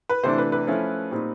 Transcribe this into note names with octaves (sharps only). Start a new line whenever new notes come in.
B4
C3 E3 A3 D4 C5
B4
B4
F3 A3 C#4 E4
A#2 G3 C4 D#4